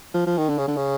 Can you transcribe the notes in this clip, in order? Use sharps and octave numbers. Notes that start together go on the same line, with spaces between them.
F3
F3
D#3
D3
C#3
D3
C#3